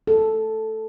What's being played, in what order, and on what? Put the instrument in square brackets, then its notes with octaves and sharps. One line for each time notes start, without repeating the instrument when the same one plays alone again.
[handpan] A4